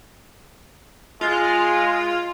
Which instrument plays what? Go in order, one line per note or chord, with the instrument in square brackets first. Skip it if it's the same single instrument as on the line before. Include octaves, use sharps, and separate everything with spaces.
[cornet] G#3 [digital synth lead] F4